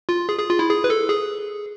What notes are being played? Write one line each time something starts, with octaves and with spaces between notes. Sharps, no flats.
F4
G#4
G#4
F4
E4
G#4
B4
A4
G#4